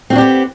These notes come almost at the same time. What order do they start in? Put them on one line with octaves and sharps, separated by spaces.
C4 F#4 D4 G4 B3